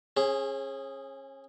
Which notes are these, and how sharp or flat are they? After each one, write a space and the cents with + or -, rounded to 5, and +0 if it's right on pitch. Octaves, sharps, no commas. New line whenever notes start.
C#4 -35 G#4 +0